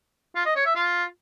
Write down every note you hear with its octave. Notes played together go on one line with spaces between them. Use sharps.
F4
D#5
C#5
E5
F4